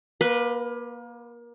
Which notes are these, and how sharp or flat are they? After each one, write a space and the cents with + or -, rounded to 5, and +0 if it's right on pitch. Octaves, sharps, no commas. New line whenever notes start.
A#3 +30 B4 +0